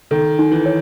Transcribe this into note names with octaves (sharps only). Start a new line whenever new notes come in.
D#3 A4
D#4
E3
C#5